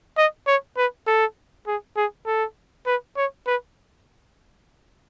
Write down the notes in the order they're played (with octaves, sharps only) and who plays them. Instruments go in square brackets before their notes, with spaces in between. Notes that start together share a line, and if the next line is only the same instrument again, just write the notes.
[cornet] D#5
C#5
B4
A4
G#4
G#4
A4
B4
C#5
B4